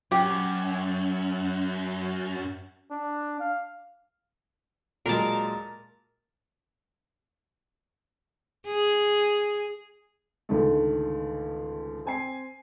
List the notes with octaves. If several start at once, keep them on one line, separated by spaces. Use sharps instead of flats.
F#2 G4
D4
F5
A#2 F#3 G#3 A#4 A5
G#4
C#2 G#2 D3 D#3 A3
C4 G#5 C7